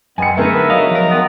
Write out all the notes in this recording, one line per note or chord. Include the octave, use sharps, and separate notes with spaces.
F#2 G#3 B3 C4 G#5 C#7
D3 A3 B3 D#4 G#4 A#4 E5
B4
F#3 D#5 F5
F3 A#4 D#6
D#3 G#3 B3